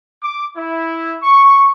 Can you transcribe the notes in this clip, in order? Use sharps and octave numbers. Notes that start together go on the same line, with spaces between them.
D6
E4
C#6